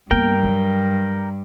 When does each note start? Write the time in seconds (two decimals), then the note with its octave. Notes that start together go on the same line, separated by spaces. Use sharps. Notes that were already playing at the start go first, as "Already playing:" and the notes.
0.11 G2 A#3 B3 A#4 G5
0.43 F#3